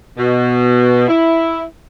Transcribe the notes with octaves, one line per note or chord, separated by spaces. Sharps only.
B2
E4